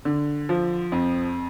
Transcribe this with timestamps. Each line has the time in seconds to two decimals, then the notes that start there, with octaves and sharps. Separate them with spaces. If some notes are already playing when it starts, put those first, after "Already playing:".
0.05 D3
0.49 F3
0.92 F2